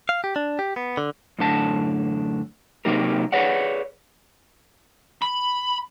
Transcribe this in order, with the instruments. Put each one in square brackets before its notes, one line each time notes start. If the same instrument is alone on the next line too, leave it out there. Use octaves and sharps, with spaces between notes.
[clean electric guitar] F5
G4
D4
G4
B3
D3
[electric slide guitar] F#2 A2 D3 A5
C3 F#3 A#3 D#4 G4 A#4
G#4 B4 C#5 D5 F#5
[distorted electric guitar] B5